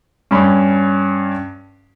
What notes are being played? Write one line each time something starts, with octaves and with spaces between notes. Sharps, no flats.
G2 C#4 B5